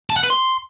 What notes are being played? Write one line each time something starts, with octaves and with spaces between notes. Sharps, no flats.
A5
F#5
B4
C6